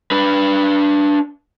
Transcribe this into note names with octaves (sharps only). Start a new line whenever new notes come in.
D4 B4